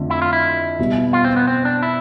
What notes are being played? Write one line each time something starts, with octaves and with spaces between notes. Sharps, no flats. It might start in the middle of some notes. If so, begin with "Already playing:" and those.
Already playing: F2 D3 A3
E4
F4
E4
E2 B2 G3
F4
C4
B3
C4
D4
E4